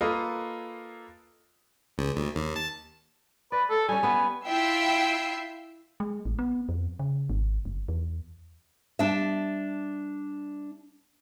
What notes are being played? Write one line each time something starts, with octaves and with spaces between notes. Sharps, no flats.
A#3 F4 A4 B4 D#5
C#2
D2
D#2
A5
B4 D5
A4
G3 C#4 G#5
B3 B4
E4 F4 E5 G5 E6 C7
G#3
A1
B3
F2
C#3
G#1
F#1
E2
G3 D4 E5